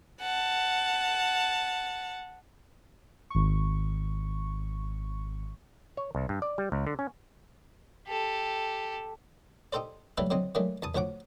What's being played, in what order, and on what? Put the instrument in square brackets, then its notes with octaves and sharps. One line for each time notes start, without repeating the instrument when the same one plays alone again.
[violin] F#5 A5
[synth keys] G#1 C#6
[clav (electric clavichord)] C#5
C2
G2
D5
G3
C#2
D3
C#4
[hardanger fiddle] G4 A4
[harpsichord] D#4 G4 A4 C5 D5
F#3 G3 A3 D4 A4 B4
D3 F#3 C4 D#4
D#3 F#3 G#3 A3 D4
E2 A5 D#6
D2 F3 C#5 F#5 D6